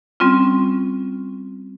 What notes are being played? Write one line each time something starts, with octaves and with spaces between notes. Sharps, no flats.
G3 C4 C#4 F4